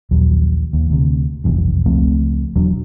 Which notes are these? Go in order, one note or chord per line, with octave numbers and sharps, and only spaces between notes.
A#1 D#2 F#3
D#2
D2 C3
F1 B1 E2 G2
C#2 F3 A3 C4
E1 E2 F#3 D4